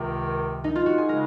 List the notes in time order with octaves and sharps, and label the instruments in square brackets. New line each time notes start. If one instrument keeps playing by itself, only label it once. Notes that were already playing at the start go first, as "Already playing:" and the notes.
Already playing: [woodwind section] C#2 C3 D#3 [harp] A#4
[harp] D#4
F4
F#4
G#4
[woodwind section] C#3 G#3 [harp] A#4